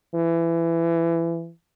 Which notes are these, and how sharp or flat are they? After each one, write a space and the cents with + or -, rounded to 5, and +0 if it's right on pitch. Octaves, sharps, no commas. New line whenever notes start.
E3 +20